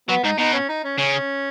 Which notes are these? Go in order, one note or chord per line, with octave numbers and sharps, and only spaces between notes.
F#3 B3
G#2 D#4
B2 D#4
C#4
D#4
C#4
C#3 C#4